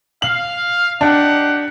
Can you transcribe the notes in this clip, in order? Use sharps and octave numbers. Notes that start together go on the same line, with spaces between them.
F5 F#7
D4 D#4 G4 F#5